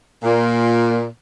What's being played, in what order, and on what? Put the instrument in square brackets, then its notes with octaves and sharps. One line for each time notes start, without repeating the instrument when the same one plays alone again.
[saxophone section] A#2